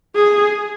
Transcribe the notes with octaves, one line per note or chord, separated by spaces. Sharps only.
G#4